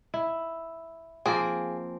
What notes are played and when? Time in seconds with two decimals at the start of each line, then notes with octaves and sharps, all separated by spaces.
0.14 E4
1.26 F3 A#3 C4 G#4